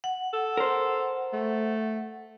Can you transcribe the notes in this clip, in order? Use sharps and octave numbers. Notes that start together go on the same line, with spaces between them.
F#5
A4
A#4 C5
A3